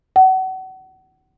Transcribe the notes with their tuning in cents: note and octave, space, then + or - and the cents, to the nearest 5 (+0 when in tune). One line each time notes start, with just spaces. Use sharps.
F#5 +30